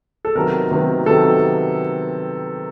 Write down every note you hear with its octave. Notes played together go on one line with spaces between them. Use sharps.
A4
C3 D#3 F#3 B3 A#4
C3 D#3 F#3 B3
C3 D#3 F#3 B3 A4